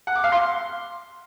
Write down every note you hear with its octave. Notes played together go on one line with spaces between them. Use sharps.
F#5
D6
F5
C6